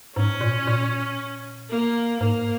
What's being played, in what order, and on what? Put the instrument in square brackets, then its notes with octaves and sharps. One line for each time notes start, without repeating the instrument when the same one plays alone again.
[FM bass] G#2 [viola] C#4
[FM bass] A#2
A#2
[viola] A#3
[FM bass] G#2 [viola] A#3